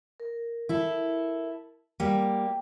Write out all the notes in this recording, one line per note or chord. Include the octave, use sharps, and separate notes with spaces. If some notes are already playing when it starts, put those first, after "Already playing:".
A#4
E4 A4
G3 A#3 G5